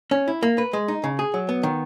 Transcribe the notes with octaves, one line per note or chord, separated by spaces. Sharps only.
C#4
E4
A#3
B4
G#3
D#4
C#3
G#4
F#3
B3
D#3